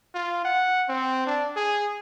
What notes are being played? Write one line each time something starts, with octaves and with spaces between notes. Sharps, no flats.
F4
F#5
C4
D4
G#4